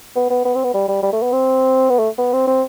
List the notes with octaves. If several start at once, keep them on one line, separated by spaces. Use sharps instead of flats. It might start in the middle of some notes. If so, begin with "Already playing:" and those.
B3
B3
B3
C4
B3
G3
G3
G3
A3
B3
C4
B3
A3
B3
C4
C4